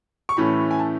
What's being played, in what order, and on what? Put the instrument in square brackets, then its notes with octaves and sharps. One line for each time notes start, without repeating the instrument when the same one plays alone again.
[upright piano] C#6
A2 E3 A3 C#4 B5
G#5
A5